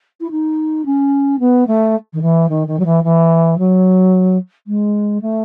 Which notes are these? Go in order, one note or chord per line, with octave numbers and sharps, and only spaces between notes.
E4
D#4
C#4
B3
A3
D#3
E3
D#3
D#3
F#3
E3
E3
F#3
G#3
A3